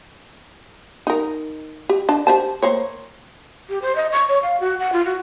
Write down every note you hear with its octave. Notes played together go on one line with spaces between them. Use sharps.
D#4 A#4
G4
D4 A5
G4 C5 A5
A#3 C5 C#5
G4
C5
D#5
C#6
C#5
F5
F#4
F#5
F4
F#4